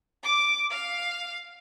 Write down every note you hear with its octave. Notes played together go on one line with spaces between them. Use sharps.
D6
F5